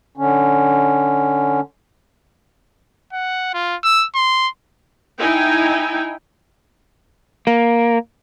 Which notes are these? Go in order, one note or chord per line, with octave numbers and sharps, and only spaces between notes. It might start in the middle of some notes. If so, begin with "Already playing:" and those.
D3 C#4
F#5
F4
E6
C6
D#4 E4 G5 G#5
A#3